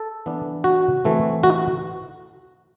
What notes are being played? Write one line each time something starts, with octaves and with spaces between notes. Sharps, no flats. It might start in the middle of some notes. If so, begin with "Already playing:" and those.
Already playing: A4
E3 B3 D4
F#4
E3 A3 C4
F#4